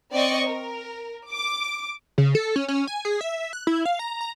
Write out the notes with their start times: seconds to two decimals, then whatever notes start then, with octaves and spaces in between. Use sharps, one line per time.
0.12 C4 D5 D#5 C#6
0.47 A#4
1.31 D6
2.18 C#3
2.35 A4
2.56 C#4
2.68 C#4
2.87 G#5
3.05 G#4
3.21 E5
3.53 F#6
3.67 E4
3.85 F5
3.99 A#5
4.21 A#5